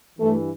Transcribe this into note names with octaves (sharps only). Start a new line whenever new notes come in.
G2 E3 A3